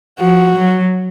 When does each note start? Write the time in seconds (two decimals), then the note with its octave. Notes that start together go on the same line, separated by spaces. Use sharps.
0.20 F3 F#4
0.56 F#3